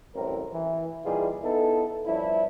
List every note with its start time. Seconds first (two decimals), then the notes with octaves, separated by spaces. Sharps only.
0.15 A1 F#2 A2 C3 G3 A#4
0.52 E3
1.05 A#2 E3 G3 D#4 F4 G#4
1.43 B3 D#4 E4 A4
2.06 G2 F3 C#4 D4 E4